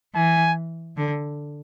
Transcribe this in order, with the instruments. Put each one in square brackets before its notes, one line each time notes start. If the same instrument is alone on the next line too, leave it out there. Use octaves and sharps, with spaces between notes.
[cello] E3 [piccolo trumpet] G#5
[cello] D3